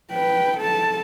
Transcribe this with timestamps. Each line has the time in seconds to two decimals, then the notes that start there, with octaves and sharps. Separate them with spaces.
0.11 B4 G5
0.58 A4 A5